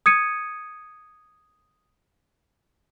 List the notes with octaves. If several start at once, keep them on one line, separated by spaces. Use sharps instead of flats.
D#6 G#6 C#7 D#7